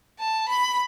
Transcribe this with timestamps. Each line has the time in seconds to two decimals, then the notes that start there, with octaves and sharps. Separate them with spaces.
0.19 A5
0.48 B5